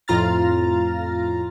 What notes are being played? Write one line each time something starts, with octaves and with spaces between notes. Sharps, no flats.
F2 A2 F4 A#5 F6 A6